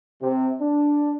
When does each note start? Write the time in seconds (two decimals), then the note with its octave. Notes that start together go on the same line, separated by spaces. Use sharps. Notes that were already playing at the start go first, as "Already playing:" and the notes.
0.21 C3
0.61 D4